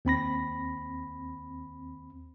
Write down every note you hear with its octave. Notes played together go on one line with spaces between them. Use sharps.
D#2 C4 B5 A#6